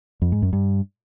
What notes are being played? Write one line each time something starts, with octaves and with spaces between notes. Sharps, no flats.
F2
G#2
F#2
G2